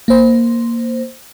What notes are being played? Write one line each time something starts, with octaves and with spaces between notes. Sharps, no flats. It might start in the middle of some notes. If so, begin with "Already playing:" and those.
A#3 C5